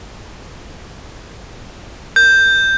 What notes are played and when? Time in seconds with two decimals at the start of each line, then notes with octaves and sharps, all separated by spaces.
2.16 G6